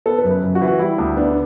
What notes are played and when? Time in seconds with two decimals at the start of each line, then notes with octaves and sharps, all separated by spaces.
0.06 B3 A4
0.18 B4
0.24 F#2
0.31 B4
0.43 F#2
0.55 F#4
0.61 E3
0.68 F#4
0.79 G3 E4
0.98 D2
1.17 B3 D4